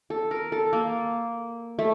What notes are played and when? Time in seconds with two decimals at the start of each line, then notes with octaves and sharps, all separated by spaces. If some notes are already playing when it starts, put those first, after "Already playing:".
0.10 A4
0.31 A#4
0.52 A4
0.73 A#3
1.79 A3